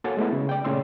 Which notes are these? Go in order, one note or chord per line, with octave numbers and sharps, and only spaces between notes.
A#3 F#4 A4 C#5 G#5 A6
G#3 A3 B3 E4
C#3
D5 G5
A#2 C#3 A3 C#5 C6 E6